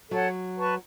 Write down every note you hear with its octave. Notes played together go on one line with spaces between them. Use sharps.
F#3 A4 C#5 F#5
B4 A5 C#6